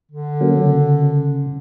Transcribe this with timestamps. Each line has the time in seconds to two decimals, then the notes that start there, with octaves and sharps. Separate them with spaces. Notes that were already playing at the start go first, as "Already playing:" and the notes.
0.11 D3
0.41 F#3 A#3 C#4
0.57 C#3